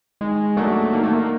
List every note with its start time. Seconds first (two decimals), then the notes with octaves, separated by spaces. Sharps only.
0.21 D#3 G#3
0.57 F#3 A3 A#3 D4 F#4
0.93 D#3 A#3
1.03 A3
1.13 A#3